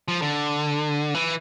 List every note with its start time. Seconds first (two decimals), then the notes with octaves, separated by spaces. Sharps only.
0.08 F3
0.22 D3
1.14 E3